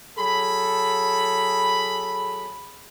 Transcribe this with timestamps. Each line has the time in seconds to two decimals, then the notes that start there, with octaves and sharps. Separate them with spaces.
0.18 F#3 G#4 A4 B5